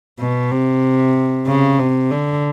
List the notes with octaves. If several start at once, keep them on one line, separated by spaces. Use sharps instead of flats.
B2
C3
C#3
C3
D3